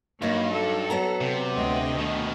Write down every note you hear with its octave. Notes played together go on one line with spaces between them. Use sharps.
G2 F#3 A#3 D#4
A4
F#3 B3 A#5
C3
D2 D#5
B2 D#3